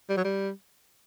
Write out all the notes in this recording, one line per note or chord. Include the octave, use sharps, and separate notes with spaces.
G3
F#3
G3